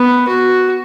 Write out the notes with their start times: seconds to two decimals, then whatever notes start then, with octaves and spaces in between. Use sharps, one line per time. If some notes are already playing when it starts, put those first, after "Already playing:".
Already playing: B3
0.28 F#4